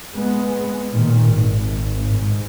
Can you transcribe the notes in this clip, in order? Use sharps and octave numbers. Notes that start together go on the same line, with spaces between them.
G#3 B3
A#2 D#3
G#1
G#2